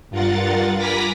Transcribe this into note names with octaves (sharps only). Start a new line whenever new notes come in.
G2 F4 A#4 F#5 A6
G#5 A#5 B5 D6 A#6 B6